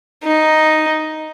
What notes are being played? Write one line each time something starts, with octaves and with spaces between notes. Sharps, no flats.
D#4